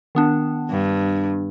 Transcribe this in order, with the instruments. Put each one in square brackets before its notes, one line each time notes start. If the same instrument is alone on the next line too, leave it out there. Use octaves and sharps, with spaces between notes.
[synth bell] D#3 B3 D4
[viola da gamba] G2